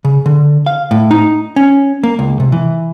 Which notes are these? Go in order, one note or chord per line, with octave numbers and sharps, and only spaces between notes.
C#3
D3
F5
A2
D#4
C#4
A#3
C#2
C3
E3